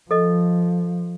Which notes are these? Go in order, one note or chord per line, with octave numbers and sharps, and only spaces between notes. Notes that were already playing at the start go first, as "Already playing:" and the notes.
F3 A4 D#5